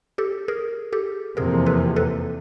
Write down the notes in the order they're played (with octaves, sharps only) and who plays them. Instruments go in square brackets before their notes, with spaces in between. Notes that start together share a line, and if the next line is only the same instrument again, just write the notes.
[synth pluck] G4 A4
G#4 A#4
G4 A4
[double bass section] F1 E2 C3 F3 A#3 [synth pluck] G#4 A#4
[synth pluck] A4 B4
A4 B4